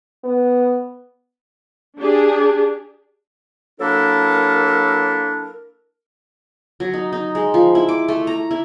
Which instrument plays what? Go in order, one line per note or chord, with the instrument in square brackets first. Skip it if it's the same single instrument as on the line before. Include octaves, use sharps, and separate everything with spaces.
[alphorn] B3
[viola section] D4 G4 G#4
[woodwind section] F#3 A#3 D4 E4 A4 A#4
[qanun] F#3
D#4
D#4
G#3
F3
E4
D6
A3
A#5
E4